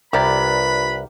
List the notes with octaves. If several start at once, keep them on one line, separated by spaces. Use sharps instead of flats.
C2 D4 F4 G4 A#4 B4 D5 B5